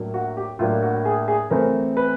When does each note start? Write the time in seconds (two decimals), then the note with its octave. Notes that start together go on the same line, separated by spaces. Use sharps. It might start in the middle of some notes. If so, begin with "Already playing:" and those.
Already playing: A2 F#3 A#3 D4
0.14 F#4
0.37 G4
0.59 A2 F#3 A#3 D4 F4
0.83 F#4
1.05 G#4
1.28 G#4
1.50 E3 A3 C4 A#4
1.97 B4